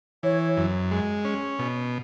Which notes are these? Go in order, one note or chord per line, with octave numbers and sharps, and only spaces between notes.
E3 C#5
F#2
G#3
C#4
B2